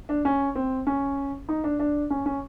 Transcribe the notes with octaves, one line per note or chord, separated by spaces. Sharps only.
D4
C#4
C4
C#4
D#4
D4
D4
C#4
C#4